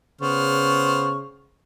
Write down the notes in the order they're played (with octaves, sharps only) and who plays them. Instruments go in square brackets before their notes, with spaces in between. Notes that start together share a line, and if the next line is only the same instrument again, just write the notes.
[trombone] C#3 [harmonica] B3 C5 F6 [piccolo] C#6